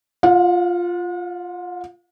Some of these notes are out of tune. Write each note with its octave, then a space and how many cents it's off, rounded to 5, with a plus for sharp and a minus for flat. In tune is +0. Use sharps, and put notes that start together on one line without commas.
F4 +0 F#5 -45